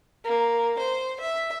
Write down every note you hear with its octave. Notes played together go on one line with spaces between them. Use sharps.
A#3
C5
E5